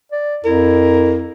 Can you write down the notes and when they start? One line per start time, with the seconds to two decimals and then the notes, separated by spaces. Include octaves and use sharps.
0.12 D5
0.45 F2 E4 A#4